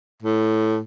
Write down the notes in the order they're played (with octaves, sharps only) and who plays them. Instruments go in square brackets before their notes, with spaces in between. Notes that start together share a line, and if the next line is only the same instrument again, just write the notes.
[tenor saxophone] A2